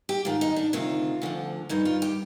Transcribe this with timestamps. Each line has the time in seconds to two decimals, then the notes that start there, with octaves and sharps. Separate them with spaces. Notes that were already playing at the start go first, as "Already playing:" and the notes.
0.09 G4
0.25 G#2 D#3 F4
0.41 D#4
0.56 D4
0.73 D2 C3 D#3 F4
1.22 D2 D3 F3
1.69 G2 D#3 D#4
1.85 F4
2.02 G4